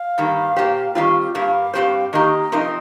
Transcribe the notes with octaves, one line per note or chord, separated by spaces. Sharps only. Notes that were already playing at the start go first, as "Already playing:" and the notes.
Already playing: F5
G2 D#3 G3 A#3
A#2 A#3 G4 C5
D#3 G3 C4 F4
G2 G3 A#3 F5
G2 D#3 C4 G4 C5
D#3 A#3 D#4 G4 D#5
C3 F3 C4 D#4 A#4